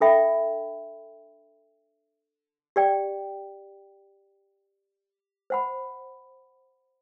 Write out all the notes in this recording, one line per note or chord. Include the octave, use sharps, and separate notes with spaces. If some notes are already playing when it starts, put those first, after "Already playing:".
D4 A4 E5 G5 B5
G4 D5 G5
C5 F#5 B5